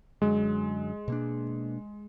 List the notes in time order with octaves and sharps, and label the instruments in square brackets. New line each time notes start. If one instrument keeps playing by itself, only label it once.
[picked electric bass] F#2 D3 F#3 [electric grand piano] G#3
[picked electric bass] B2 A#3 D4